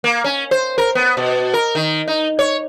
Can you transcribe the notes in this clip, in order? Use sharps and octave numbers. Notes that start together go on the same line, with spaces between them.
A#3
C#4
C5
A#4
B3
B2
A#4
D#3
D#4
C#5